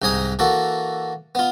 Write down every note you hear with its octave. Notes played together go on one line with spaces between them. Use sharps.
C2 G#2 D#4 G#5 D#6
E3 A#3 F#4 A4
B3 F4